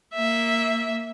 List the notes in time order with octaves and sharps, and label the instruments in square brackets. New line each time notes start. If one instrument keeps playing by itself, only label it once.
[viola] A#3 E5